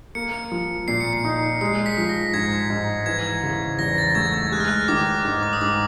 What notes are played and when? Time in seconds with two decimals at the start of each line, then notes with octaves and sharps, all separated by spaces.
0.15 A#3 C#7
0.51 F3
0.88 A#2 C7
1.01 C#7
1.13 C7
1.25 D#4
1.61 G#3 C7
1.86 B6
1.97 F3
2.09 A#6
2.34 G#2 G#6
2.70 G#2
3.06 E3 G#6
3.43 C#3
3.79 E2 A#6
3.98 A6
4.15 A3 G#6
4.34 G#6
4.52 G#3 F#6
4.60 F6
4.68 F#6
4.88 D#3 D6
5.25 G#2
5.43 D6
5.53 D#6
5.61 G#2 D6